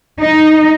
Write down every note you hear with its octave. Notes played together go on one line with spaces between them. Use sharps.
D#4